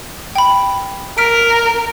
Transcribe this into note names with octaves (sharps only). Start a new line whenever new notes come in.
G5 B5
A#4 F6 B6 D7